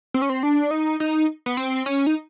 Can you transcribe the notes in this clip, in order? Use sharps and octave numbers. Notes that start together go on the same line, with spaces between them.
C4
C#4
C4
D4
D#4
D#4
B3
C4
C#4
D#4